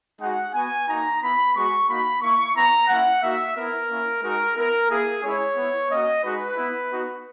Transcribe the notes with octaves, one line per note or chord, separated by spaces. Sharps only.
G#3 D#4 F#4 F#5
B3 F#4 G#5
A#3 D#4 F#4 A#5
B3 E4 B5
G#3 B3 F#4 C#6
A#3 D#4 F#4 B5
A#3 E4 C#6
B3 E4 A#5
A#3 C#4 E4 F#5
A#3 D#4 F#4 E5
B3 E4 A#4
A#3 C#4 E4
G#3 D#4 F#4 A#4
B3 E4 A#4
A#3 E4 G#4
G#3 C#4 E4 C#5
B3 E4
A#3 C#4 F#4 D#5
G#3 D#4 F#4 B4
B3 E4
B3 D#4 F#4